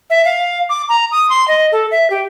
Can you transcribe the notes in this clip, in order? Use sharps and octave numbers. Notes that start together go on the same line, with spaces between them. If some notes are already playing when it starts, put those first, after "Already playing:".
E5
F5
D6
A#5
D#6
C6
D#5
A4
E5
G4